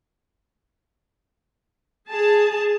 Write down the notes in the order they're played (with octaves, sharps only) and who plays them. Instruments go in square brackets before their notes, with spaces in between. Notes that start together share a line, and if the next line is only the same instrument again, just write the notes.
[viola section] G#4 A5